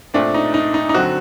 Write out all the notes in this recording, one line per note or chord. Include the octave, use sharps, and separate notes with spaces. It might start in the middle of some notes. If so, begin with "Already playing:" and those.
A#2 A3 C4 D4
D#4
D#4
D#4
D#4
D3 F#3 C4 F#4